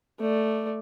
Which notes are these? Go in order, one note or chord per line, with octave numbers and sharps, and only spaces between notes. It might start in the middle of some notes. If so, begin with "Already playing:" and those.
A3 D5